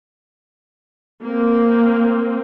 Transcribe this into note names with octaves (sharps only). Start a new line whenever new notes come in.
A#3 C4